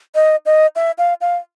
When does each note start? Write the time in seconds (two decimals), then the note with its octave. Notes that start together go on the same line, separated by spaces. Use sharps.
0.15 D#5
0.46 D#5
0.76 E5
0.98 F5
1.21 F5